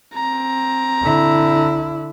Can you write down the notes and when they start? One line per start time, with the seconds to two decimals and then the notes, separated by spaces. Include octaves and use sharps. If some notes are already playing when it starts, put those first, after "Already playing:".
0.14 C4 A#5
1.02 D3 E4